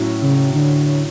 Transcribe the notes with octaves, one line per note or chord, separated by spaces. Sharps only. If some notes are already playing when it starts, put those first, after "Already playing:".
Already playing: A2 F#3 C#4 E4
C#3
D3